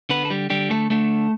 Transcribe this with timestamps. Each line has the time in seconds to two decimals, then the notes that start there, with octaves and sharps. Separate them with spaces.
0.09 D3 B3 B4
0.25 A4
0.30 G3 G4
0.50 D3 G3 G4
0.70 A3 A4
0.90 D3 A3 A4